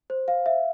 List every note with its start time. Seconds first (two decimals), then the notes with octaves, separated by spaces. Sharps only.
0.10 C5
0.28 F5
0.46 E5